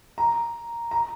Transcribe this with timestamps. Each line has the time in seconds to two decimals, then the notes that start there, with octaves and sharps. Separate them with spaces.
0.18 A#5
0.91 A#5